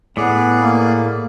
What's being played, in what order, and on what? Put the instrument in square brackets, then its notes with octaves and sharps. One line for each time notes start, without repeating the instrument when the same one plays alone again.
[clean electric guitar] A2 [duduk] B3 [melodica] G#4 D5
[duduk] A#3